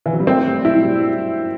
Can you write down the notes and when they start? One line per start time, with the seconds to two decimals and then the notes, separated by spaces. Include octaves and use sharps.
0.06 E3
0.13 F#3
0.20 G3
0.27 A3 C4
0.46 G3
0.64 F#3 E4
0.83 G3